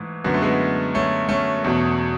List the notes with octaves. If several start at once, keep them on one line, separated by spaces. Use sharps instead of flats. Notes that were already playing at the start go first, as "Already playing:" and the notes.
Already playing: G#2 E3 A3
F#2 D3 B3
A3
G#3 B3
A3 C#4
A3 C#4
E2 B2